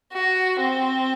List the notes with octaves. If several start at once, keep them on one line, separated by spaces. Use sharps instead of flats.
F#4
C4